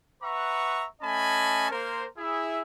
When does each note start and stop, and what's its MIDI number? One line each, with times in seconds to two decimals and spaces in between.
0.22 0.85 71
0.22 0.85 76
0.22 0.85 78
0.22 0.85 82
0.22 0.85 85
1.02 1.70 57
1.02 1.70 61
1.02 1.70 75
1.02 1.70 80
1.02 1.70 81
1.02 1.70 83
1.71 2.06 58
1.71 2.06 70
1.71 2.06 72
2.17 2.61 64
2.17 2.61 68
2.17 2.61 76